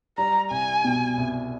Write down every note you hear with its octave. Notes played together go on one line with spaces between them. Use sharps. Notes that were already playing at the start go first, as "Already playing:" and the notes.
G3 A#5
C2 G#5
B2
C2